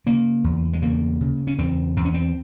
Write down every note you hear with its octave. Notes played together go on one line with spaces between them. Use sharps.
C#3 A#3
E2
G#3
C#3 A#3
C#3
C#4
E2 C4
E2 C4
C#4
C4